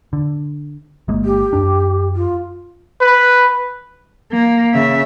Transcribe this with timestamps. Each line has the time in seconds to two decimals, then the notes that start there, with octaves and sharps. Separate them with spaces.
0.13 D3
1.08 G1 G#3 A#3
1.25 G4
1.53 F#2 D4
2.15 F4
3.01 B4
4.32 A#3
4.73 C#3 E5